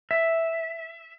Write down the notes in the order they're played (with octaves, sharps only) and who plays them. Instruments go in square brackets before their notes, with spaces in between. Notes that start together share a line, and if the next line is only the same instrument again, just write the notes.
[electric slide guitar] E5